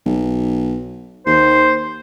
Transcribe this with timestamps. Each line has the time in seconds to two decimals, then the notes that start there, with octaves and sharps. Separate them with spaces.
0.06 B1
1.26 D#2 C5